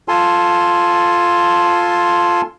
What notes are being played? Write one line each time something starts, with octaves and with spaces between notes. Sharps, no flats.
F4 A4 G#5 A5 C6